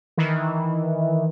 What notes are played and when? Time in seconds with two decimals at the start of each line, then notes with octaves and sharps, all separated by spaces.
0.18 D#3 E3